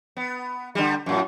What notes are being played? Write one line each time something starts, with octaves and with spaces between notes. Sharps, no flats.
B3
D3 G3
F#2 A2